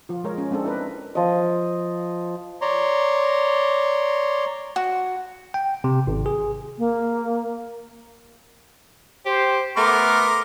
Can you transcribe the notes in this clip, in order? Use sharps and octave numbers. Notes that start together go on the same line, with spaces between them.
F3 F4
G#3 A#4 C#5
C#4
G#3 C4 D4 A4
E4 A#4 B4
F3 D#5
C#5 D5 A#5 C6
F#4
G5
C3
G#1
G#4
A#3
G4 C5
A3 B3 A#4 A#5 C6 D6